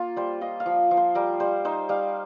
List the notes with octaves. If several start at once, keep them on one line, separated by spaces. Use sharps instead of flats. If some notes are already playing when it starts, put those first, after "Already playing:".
Already playing: A#3 F4
G3 C5
F4 D#5
F5
F3
F3
C5
G3 A#4
G3 C5
D#4 C5
G3 F5